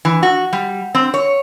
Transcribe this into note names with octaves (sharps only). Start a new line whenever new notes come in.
E3
F#4
G3
C4
C#5